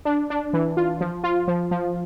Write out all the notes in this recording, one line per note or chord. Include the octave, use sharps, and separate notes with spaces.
D4
D4
E3
F4
F3
F4
F3
F3